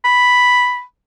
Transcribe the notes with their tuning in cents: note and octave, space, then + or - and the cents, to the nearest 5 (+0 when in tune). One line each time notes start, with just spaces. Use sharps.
B5 +0